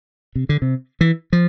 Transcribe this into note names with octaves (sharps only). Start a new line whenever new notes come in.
C3
D3
C3
E3
F3